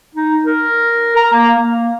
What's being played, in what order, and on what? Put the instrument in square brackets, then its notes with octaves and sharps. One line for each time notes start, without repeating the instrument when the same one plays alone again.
[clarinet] D#4
A#4
A#5
A#3
A#3